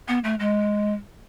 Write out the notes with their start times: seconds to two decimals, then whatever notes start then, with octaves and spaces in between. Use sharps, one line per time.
0.08 B3
0.24 A3
0.40 G#3